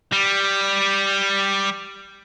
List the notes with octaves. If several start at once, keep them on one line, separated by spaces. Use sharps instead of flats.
G3